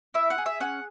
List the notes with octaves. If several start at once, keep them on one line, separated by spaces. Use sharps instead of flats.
E4 E5
F#5
G#4
E5
C#4 F#5